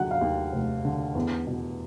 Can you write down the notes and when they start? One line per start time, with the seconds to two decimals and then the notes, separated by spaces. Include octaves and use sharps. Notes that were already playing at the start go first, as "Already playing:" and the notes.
Already playing: D#2 D3 F#3 F#5
0.11 F5
0.21 D#2
0.52 F1
0.85 D3
1.15 E2
1.47 B2